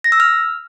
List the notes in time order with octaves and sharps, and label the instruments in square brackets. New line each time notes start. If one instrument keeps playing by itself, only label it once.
[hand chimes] A#6
E6
F6